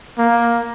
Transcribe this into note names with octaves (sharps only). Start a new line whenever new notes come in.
A#3